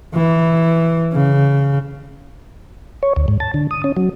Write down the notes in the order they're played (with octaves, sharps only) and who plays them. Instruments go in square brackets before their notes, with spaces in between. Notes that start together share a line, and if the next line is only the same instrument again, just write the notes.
[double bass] E3
C#3
[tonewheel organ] C#5
D2
G#2
A5
D3
D#6
C#4
F#3